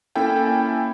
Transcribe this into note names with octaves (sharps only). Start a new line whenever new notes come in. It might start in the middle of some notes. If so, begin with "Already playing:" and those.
A#3 C#4 E4 A4 G5 G#5